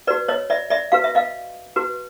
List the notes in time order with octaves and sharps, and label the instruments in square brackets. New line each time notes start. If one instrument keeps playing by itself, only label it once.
[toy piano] F#4 B4 D5
C#5 D#5
D5 E5
D5 E5
F#4 B4 F5
E5
D#5 F5
F#4 B4